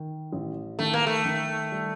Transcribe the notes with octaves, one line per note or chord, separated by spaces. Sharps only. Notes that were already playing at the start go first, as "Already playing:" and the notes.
Already playing: D#3
A1
D#3 A3
A#3
A3
D#3
G3